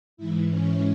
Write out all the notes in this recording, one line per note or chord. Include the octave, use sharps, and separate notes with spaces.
G#2 E3 E4
C#4